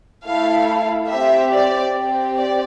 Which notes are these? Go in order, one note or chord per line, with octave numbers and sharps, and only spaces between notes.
A3 E4 A4 F5
C4 G4 E5
D5
C4 G4
D5